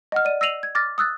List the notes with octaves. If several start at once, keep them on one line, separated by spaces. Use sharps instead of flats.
D#5 F#5 F6
D5 D#7
E6 A#6 C7 D#7 F7 F#7
G#6
D6 F6 A6 A#6
D#6 E6 F#6 A6